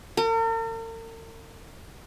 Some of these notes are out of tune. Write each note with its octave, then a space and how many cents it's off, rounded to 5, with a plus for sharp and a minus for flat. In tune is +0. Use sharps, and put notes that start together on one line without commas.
A#4 -45